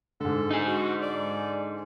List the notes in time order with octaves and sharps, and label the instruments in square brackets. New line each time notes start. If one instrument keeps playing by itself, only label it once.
[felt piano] G#2 D3 [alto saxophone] A4
[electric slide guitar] D#4 G#4
[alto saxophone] F#4
D5